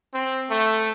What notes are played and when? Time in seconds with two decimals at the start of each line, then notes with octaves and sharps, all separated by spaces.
0.13 C4
0.50 A3